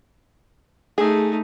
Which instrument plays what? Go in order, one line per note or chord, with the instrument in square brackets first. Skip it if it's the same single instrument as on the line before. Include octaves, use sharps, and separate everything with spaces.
[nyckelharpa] A3 D#4 [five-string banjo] G#4